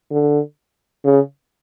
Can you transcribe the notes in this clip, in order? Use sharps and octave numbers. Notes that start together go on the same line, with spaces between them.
D3
C#3